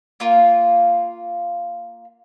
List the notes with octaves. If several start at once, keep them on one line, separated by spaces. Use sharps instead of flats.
A#3 F4